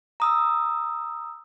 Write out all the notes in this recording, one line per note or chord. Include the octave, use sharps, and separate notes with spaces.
A#5 D#6 E6